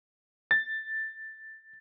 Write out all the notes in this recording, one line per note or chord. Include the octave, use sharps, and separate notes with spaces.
A6